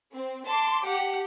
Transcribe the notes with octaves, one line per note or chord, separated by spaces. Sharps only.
C4
A5 C6 D6
G4 F#5